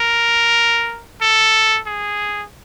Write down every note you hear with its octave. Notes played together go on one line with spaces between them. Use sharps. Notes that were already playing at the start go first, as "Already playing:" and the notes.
Already playing: A#4
A4
G#4